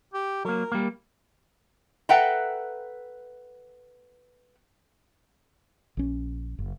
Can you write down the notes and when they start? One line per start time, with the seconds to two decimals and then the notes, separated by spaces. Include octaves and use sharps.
0.14 G4
0.45 F#3 A#3 A#4
0.72 G3 A#3
2.09 A4 B4 E5 F#5 G5 A#5
5.97 A#1 C#4
6.59 F#1